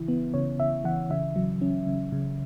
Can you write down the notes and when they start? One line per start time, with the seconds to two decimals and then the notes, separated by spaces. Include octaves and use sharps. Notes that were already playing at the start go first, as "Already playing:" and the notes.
Already playing: C#3 E3 E4
0.08 B3
0.34 C#3 C#5
0.60 C#3 E5
0.85 E3 F#5
1.10 C#3 E5
1.36 F#3
1.62 C#4
1.87 C#3
2.12 C#3